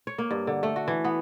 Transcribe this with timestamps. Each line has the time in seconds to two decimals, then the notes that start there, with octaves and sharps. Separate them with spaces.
0.07 C#5
0.18 A#3
0.31 G2
0.47 D3
0.63 A3
0.76 F#4
0.88 E3
1.05 B3